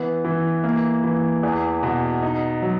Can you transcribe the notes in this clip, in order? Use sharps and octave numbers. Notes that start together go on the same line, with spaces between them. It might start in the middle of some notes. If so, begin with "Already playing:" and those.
Already playing: E3 B3
E3
A#3
E3
E2
B2
D#4
F#3